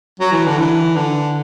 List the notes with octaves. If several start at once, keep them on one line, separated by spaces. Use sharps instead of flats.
F#3
E3
D3
E3
D3